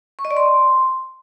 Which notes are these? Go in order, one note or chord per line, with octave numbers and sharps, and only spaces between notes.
C#6
D#5
D5
C6